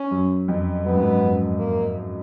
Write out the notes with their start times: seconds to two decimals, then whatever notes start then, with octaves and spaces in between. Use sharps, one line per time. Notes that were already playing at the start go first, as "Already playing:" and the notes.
Already playing: C#4
0.11 F#2
0.48 F2
0.85 F#2 B3
0.93 G#2
1.01 F#2
1.21 F2
1.59 A#3